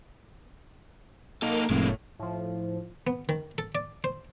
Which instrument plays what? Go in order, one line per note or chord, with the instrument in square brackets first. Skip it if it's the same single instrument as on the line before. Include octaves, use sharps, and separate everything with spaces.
[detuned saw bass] A#3 [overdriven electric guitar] D#4 A4
[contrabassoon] F1 [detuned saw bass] A2 [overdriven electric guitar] G#3 A#3
[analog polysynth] A2 F3
[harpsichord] B3
D#3
A4
D5
C5